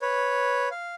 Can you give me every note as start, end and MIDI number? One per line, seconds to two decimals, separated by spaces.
0.02 0.69 71
0.02 0.69 73
0.71 0.95 77